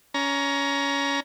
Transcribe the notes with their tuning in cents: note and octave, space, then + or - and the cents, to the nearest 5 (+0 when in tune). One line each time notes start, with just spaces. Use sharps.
C#4 +20 A#5 +15